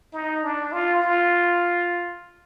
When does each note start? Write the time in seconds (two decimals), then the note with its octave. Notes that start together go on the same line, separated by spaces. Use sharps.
0.13 D#4
0.43 D4
0.72 F4
1.02 F4